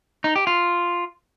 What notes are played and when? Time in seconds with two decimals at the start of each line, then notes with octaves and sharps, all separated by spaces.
0.24 D#4
0.36 G4
0.47 F4